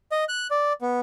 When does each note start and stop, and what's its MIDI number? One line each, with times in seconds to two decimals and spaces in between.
0.12 0.24 75
0.29 0.47 90
0.51 0.73 74
0.81 1.00 59